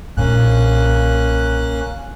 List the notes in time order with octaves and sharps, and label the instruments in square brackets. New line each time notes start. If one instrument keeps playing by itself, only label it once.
[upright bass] B1 A#2 [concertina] A#3 C#4 F#6